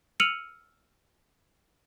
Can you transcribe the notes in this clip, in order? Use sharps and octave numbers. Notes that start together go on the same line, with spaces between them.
E6 F6 C#7 D#7 F7 F#7